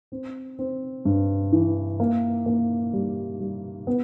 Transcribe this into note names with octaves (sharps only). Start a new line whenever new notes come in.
C4
C4
G2
E3
A#3
A#3
G3
G3
B3